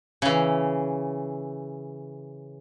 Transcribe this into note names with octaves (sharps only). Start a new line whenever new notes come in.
C#3 E3